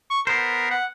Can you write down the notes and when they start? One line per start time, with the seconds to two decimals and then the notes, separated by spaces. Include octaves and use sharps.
0.11 C#6
0.27 B3 A#4 C5
0.71 F#5